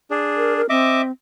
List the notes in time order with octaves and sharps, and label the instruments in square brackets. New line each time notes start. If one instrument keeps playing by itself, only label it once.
[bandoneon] D4 G#4
[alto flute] A#4
A#4
[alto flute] C4 [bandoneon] D#5 E5 D6